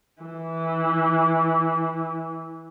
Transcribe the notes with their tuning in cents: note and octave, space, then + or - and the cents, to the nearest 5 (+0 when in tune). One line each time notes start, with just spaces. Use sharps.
E3 -15